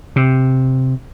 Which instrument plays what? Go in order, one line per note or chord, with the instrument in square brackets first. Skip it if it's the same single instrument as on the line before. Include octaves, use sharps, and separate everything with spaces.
[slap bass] C3